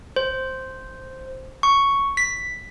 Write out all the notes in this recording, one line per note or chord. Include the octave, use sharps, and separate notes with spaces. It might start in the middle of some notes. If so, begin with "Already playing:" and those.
C5
C#6
B6